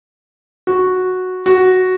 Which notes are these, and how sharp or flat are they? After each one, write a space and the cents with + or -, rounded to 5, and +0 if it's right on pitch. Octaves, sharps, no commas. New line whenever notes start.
F#4 -5
F#4 +0